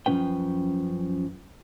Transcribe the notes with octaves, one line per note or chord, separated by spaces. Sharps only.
F#2 F3 F#3 C#4 B4 G5